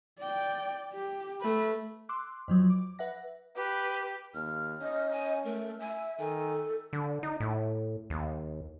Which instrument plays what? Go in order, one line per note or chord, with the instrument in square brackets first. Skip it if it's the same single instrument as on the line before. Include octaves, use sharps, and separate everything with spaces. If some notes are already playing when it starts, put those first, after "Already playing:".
[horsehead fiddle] D5 G5
G4
A3 B4
[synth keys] C6 D6 E6 F#6
F2 F3 F#3
D6
B4 E5 F#5 A#6
[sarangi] G4 [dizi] B4
[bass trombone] D#2 [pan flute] F6
[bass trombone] C#4 [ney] D#5
[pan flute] G#5
[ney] A3 [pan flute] A#4
[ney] E5 [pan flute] G#5
[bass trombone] D#3 [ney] A4 [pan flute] G#5
[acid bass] D3
D#4
A2
D#2